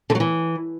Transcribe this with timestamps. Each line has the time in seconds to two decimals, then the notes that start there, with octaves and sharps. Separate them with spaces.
0.10 D3
0.15 F#3
0.20 E3